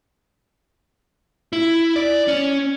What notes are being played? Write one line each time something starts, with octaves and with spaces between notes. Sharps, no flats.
E4
D5
C#4